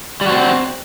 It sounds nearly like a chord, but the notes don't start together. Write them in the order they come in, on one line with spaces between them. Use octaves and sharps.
G3 F#4 C4